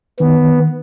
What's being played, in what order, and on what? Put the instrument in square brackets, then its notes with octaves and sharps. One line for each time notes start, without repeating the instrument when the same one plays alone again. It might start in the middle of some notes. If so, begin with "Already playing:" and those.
[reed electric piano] D#3 [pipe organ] B3